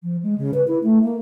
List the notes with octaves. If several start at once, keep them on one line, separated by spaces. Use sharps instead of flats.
F3
G#3
C#3
B4
E4
A3
A#3